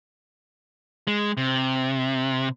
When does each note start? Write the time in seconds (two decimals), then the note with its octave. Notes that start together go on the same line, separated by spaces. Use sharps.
1.08 G#3
1.37 C3